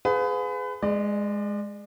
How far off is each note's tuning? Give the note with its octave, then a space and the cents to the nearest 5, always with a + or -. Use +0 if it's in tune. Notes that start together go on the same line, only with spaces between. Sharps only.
G#4 +10 B4 +30 F5 +40
G#3 +0 D5 +35